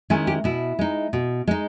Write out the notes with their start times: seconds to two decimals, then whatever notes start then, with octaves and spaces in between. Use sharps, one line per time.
0.10 D#3 G#3 C#4 E4 G#4
0.27 G4
0.44 B2 E4
0.79 G#3 D#4
1.13 B2
1.47 G#3 D#4